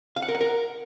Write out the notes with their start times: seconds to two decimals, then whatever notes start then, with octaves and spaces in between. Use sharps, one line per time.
0.16 F5
0.22 F#5
0.29 A#4
0.35 F#5
0.41 A#4